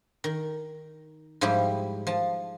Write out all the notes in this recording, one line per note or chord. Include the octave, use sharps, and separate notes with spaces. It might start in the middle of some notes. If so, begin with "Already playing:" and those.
D#3
G#2 F3 G3 E4 G4
F3 A5